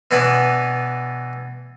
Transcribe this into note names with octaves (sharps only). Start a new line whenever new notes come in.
B2 E3 B3 D4 B4